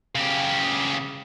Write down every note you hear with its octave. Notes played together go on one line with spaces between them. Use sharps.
C#3 G4